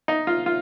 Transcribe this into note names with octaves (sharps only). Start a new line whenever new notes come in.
D#4
F4
F4